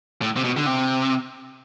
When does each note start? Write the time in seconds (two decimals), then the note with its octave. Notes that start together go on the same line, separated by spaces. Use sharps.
0.22 A2
0.37 C3
0.44 B2
0.57 D3
0.66 C3